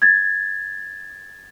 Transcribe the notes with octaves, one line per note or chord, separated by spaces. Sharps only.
G#6 A6